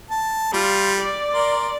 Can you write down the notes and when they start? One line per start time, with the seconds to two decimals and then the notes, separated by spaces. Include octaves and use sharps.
0.10 A5
0.53 G3 F4
0.98 D5
1.34 A#4 C6